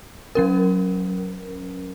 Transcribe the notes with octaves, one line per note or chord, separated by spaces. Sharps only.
F#3 C#4 A#4